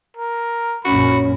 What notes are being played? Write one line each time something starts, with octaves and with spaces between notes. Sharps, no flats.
A#4
A#1 F#2 A#2 C#4 F#4 B5